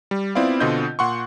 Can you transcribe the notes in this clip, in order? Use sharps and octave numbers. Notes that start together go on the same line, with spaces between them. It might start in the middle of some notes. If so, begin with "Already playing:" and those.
G3
B3 C4 E4 F4 D5 F5
B2 D3 C4 F4 D#5 G6
A#2 F#5 C6 C#6